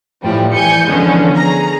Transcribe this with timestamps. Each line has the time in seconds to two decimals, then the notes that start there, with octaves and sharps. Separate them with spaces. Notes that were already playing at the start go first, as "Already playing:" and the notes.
0.22 A2 E3 F3 G3
0.53 E3 G#5 G6 C#7
0.88 D3 E3 F3 G#3 B3 C#4
1.36 G#4 A#5